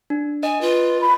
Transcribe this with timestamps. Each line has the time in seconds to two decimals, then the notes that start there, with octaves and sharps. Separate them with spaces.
0.10 D4
0.43 D#5 G#5
0.61 F4 B4
1.01 B5